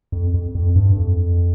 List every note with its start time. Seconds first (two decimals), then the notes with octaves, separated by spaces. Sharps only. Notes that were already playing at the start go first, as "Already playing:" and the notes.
0.12 F2
0.34 F2
0.55 F2
0.75 G2
0.97 F2